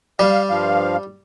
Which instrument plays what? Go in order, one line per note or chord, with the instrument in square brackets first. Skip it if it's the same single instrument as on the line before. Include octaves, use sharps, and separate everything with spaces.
[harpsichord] G3 [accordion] F5
[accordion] G2 F3 F5